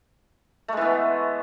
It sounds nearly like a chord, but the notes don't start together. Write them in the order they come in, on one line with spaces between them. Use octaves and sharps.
A3 G#3 E3 B3